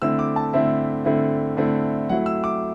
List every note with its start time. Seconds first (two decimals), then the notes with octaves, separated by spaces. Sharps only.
0.02 D3 A3 C4 E4 E6
0.19 D6
0.36 A5
0.53 D3 A3 C4 E4 E5
1.05 D3 A3 C4 E4
1.57 D3 A3 C4 E4
2.09 F#3 A3 E4 F#5
2.26 E6
2.44 D6